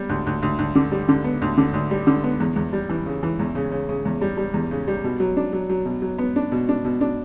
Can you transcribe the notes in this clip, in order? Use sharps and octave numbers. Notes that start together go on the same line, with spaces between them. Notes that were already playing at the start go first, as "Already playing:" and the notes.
Already playing: G3 B3
D2
D2
D2
D2
D3
G3
D3
B3
D2
D3
D2
G3
D3
B3
E2
E2
G3
E3
C#3
E3
E2
C#3
C#3
C#3
E2
G3
G3
E2
C#3
G3
B2
F#3
D4
F#3
F#3
B2
F#3
B3
D4
B2
D4
B2
D4